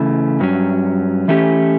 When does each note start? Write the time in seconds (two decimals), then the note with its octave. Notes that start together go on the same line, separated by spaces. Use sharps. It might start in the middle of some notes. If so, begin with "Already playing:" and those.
Already playing: C#3 E3 A3
0.40 G2 F#3 C#4
1.28 E3 A3 C#4 G4